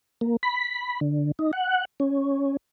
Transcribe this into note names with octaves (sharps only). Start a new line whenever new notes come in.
A#3
B5
D3
D#4
F#5
C#4